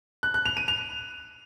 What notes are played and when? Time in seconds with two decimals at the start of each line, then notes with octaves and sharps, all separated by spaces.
0.23 F#6
0.34 F#6
0.46 F7
0.57 D#7
0.68 F7